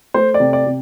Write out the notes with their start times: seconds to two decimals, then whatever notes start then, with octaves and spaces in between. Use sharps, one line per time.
0.14 A3 C5
0.34 D5
0.40 C3
0.53 D5
0.66 C3